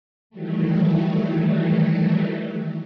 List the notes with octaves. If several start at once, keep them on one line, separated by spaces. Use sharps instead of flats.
D#3 E3 F#3 G3 A3